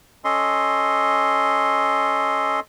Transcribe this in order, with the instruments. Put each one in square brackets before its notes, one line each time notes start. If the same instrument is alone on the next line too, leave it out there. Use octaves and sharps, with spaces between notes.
[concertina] C#4 A4 D#5 C6